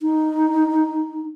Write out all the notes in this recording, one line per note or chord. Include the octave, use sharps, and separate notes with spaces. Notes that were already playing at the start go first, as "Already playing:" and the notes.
D#4